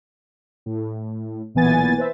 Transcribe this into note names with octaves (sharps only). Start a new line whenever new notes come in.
A2
B1 A#2 E3 B3 G#5 A6
B4 C5 E5